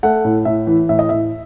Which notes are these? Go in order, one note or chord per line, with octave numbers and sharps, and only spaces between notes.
A3 F#5
A2
A2 E5
E3
A2 E5
D#5
A2 E5